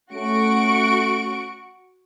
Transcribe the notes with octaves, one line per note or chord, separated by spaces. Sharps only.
A3 C#4 F#4 C#6 D7